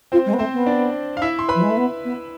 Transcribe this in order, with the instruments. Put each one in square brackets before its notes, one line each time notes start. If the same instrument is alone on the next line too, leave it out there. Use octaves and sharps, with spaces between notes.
[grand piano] C4 C5 [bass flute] F4
[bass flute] G#3
B3
[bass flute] A3 [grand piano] C4 C5
[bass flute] B3
[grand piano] D4 D5
F5
E4 E5
C6
B4 B5
[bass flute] F3
G#3
A3
B3
B3